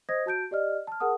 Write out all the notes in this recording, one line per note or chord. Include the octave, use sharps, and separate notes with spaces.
C5 D#5 D#6 G#6 A#6
F#4 A5 G6 D7
G4 D5 D#5 F6
A5 F6
G#4 A#4 F#5 A5 D#6